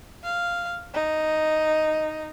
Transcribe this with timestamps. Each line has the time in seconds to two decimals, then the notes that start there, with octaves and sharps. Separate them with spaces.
0.24 F5
0.94 D#4